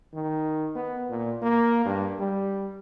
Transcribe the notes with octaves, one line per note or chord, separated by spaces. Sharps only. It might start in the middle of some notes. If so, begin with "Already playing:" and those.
D#3
B3
A#2
A#3
G2
G3